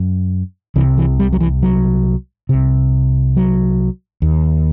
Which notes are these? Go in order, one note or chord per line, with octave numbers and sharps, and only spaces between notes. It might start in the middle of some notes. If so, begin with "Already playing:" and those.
Already playing: F#2
C2 C3 E3
E3
G3
F#3
E3
F#3
C2 C3
F#3
D#2